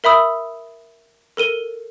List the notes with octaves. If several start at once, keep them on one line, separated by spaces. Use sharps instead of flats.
A#4 E5 B5 D#6 E6
A4 A#4 D#7 G7